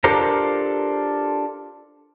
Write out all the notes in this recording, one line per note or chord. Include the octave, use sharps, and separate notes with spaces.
D4 F4 G4 A4 A#4 C5